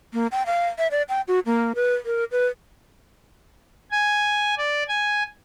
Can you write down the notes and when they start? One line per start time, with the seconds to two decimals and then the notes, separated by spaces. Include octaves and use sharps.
0.13 A#3
0.32 G5
0.46 F5
0.78 E5
0.91 D5
1.09 G5
1.28 F#4
1.46 A#3
1.75 B4
2.05 A#4
2.32 B4
3.91 G#5
4.58 D5
4.88 G#5